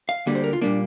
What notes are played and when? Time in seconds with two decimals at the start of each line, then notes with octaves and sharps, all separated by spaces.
0.09 F5
0.26 D2 D3 G3 A#3
0.35 C5
0.44 A#4
0.53 F4
0.61 A#2 G3 A#3 D4